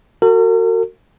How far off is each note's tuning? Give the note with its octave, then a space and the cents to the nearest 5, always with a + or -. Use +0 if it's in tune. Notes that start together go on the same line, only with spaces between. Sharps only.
F#4 +0 A#4 -45